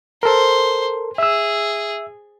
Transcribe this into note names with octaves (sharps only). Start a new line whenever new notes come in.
A4 A#4 C5
G#4 E5 E6